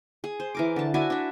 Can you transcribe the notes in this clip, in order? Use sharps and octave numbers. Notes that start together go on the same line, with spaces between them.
G#4
C5
E3 A#4 D6
D3 A5
E4 F#4 D5 G#5
D4 E5